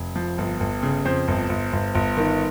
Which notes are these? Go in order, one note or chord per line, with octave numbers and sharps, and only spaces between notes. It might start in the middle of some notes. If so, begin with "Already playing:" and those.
Already playing: F1
F3
G1
G1
C#3
F2 C5
G1
G1
G1
G1
D#3